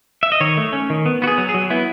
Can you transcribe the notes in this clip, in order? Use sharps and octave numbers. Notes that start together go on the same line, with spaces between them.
E5
D#5
D#3 C#5
A3
C#4
D#3
B3
B3 F#4
G#4
F#3
G#4
F#3
B3 E4